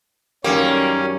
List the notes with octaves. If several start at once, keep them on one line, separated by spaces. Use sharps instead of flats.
F#2 D#3 G3 A#3 C#4